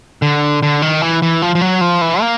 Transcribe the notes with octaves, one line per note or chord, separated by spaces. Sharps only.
D3
D3
D#3
E3
E3
F3
F3
F#3
F3
E3
A#3